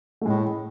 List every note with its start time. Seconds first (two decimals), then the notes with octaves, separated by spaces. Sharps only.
0.21 A3
0.25 A2 G#3